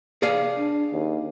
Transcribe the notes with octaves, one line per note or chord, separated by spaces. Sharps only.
G#4 D5 F5
D4
D#2